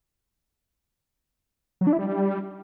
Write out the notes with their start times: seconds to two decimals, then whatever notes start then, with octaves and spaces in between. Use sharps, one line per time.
1.81 F#3
1.87 D4
1.93 E4
1.99 G3